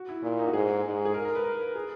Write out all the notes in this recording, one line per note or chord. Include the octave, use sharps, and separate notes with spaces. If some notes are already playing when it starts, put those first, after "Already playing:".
Already playing: F#4
E4
A#2 E4
D#4
F#4
G#2 G#4
G#2
G#4
A#4
A#4
B4
A#4
G#4